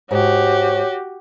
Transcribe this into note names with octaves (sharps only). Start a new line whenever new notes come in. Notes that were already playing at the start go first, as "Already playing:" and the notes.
G#2 F#4 G4 C#5